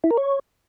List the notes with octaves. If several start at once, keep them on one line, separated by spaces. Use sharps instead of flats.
E4
A#4
C#5